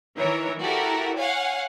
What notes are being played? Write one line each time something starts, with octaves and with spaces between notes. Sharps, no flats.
D#3 E3 A#4 C#5
E4 F#4 G4 A4 A#4
C#5 F5 F#5 G#5